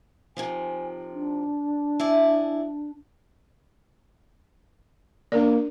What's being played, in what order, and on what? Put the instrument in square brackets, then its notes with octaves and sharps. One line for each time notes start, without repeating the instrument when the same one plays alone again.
[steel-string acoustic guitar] C3 D#3 F3 [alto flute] G#5
[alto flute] D4
[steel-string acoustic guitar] E4 G#4 D5
[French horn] A#3 [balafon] D4 A#4 D5